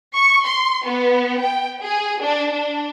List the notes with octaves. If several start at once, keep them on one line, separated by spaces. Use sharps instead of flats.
C#6
C6
B3
G5
G#4
D4
D4